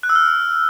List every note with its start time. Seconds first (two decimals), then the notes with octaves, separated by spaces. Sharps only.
0.03 F#6
0.09 E6
0.16 F6